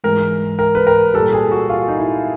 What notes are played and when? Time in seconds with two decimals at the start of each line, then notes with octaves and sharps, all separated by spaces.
0.04 G#2 E3 G#3 A#4
0.59 A#4
0.75 B4
0.87 A#4
1.14 A#2 G3 A4
1.33 G#4
1.52 F#4
1.70 F4
1.88 D#4
1.97 E4